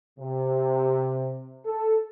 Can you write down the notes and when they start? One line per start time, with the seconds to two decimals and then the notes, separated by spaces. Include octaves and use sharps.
0.19 C3
1.65 A4